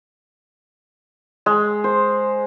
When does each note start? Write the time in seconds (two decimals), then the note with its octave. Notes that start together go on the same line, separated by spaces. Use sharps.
1.46 G#3
1.84 C5